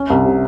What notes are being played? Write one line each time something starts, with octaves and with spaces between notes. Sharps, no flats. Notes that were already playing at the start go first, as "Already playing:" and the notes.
Already playing: C#4
C2
C3